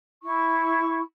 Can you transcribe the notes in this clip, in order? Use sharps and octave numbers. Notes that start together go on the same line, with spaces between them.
E4 C#6